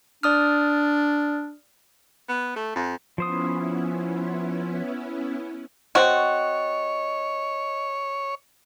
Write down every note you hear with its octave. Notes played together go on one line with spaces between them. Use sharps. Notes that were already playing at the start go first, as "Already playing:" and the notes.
D4 D5 D#6 F6
B3
A3
F2
F3 B3 C#4 E4 C5 D#6
C4 F#4 C#5 D#5